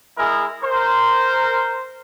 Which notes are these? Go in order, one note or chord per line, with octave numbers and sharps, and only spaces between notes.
G#3 E4 G#4 A#4
A#4 C5